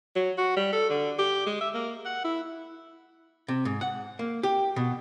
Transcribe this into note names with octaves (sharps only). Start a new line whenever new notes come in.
F#3
F#4
G3
A4
D3
G4
G#3
E5
A#3
F#5
E4
C3
G#2
F#5
A#3
G4
B2